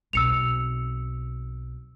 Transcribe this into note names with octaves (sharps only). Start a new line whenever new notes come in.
B1 C4 E6 C#7 F7